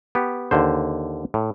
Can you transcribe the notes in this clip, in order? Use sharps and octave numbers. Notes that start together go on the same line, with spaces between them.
B3 G4
D#2 D3 C5
A2